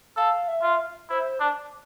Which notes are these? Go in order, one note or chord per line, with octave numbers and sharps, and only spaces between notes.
A4 F5
E5
F4
E4 C5
D4